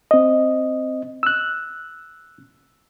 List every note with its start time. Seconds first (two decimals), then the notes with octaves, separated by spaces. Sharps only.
0.11 C4 D#5
1.23 E6 F#6